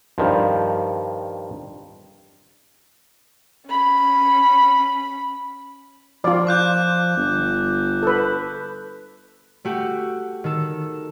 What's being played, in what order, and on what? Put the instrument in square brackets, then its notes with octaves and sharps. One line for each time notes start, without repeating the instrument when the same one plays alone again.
[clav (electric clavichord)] G2 D#3 F3
[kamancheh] C#4 B5
[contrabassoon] F3 [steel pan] F4 D5
[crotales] D6 F#6 G6
[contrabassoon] G1
[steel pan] A4 B4
[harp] A3 F#4 G4
D#3 A4